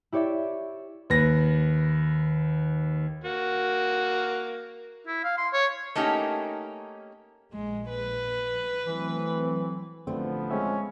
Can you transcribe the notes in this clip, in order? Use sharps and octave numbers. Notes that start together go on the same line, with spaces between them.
E4 G4 C#5 D5 E5
D#2 B4 A#6
A#3 F#4
E4
F5
C6
C#5
A3 A#3 C#4 D#4 G4
A#1 G#3
B4
E3 F#3 A3 C4
A1 D3 F3 A3 B3 C4
G#3 C4 C#4 E5